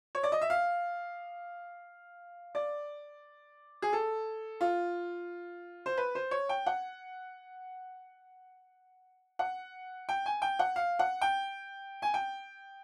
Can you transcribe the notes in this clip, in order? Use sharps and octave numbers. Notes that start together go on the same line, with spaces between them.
C#5
D5
D#5
E5
F5
D5
G#4
A4
F4
C5
B4
C5
C#5
G5
F#5
F#5
G5
G#5
G5
F#5
F5
F#5
G5
G#5
G5